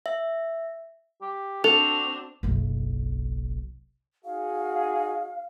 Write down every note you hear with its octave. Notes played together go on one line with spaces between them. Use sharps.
E5
G4
C4 D4 F#4 A4 F7
F#1 B1
D#4 F#4 G#4 F5